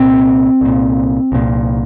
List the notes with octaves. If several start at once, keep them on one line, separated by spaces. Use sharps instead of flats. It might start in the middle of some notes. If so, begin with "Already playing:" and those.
Already playing: C2 A#2 C4
C2 A#2
C2 A#2